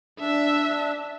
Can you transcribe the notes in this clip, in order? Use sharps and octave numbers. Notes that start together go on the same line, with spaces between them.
D4 E5